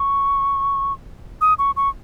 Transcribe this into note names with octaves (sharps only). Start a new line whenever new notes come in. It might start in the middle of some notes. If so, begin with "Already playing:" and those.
Already playing: C#6
D#6
C#6
C#6